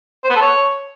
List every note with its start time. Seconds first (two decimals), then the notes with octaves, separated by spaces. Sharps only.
0.24 C5
0.30 B3
0.36 A4
0.42 C#5